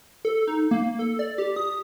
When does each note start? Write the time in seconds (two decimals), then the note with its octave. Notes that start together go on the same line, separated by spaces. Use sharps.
0.25 A4
0.47 D#4
0.71 A#3
0.99 A4
1.19 D5
1.38 G4
1.56 D#6